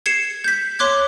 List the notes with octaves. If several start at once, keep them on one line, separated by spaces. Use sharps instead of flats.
G#6 C7 C#7 E7
G6 B6
C#5 C6 D6 F#6 G#6